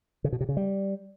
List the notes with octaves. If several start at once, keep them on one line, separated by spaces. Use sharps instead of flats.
C#3
B2
C3
C#3
G3